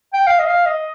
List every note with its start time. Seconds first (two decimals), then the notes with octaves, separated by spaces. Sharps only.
0.13 G5
0.27 F5
0.39 D#5
0.46 F5
0.66 D#5